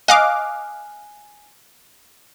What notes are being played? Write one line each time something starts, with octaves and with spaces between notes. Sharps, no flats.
D#5 F5 G#5 D6 F#6